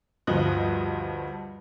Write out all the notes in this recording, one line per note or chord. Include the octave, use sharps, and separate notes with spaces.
D2 G2 F3 D#5 F#6